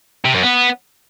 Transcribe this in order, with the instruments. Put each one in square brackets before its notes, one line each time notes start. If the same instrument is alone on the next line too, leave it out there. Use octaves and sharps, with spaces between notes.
[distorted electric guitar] C3
F#2
B3